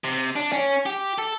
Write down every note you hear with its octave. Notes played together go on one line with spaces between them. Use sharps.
C3
D4
C#4
G4
A4